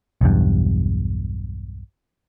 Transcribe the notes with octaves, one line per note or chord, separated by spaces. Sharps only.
B1 E2 G2